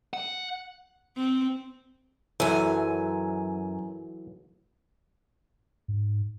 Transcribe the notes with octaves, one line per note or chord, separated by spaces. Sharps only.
F#5
C4
F#2 E3 F#3 A4 G#5
G#2